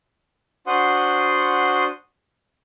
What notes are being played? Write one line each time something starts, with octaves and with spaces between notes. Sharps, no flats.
D4 F#4 C5 F#5 C6 D#6